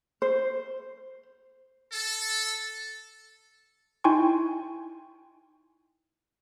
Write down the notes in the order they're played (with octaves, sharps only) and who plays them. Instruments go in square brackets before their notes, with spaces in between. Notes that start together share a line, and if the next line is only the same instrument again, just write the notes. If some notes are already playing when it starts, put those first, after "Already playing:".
[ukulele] C5
[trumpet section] A4
[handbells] D#4 E4 G5 G#5 C6 C#6